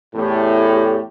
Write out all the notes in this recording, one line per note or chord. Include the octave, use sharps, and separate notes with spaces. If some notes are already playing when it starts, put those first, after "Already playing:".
E2 A2 G4